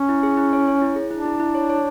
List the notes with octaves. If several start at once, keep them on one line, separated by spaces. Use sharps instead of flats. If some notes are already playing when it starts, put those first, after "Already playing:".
Already playing: C#4
E4
G#4
E4
C#5
C#5
E4
G#4
D4 E4
E4
E4
C#5
C#5